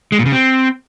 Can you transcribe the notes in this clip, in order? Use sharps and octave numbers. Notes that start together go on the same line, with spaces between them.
G#3
A#2
C#3
C4